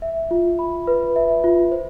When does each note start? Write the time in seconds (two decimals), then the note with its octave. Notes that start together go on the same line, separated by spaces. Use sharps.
0.02 E5
0.31 F4
0.59 B5
0.87 B4
1.16 E5
1.44 F4
1.72 C5